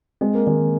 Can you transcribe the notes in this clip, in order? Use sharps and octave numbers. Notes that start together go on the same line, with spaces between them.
G#3 C4
A#3
D#3 G#3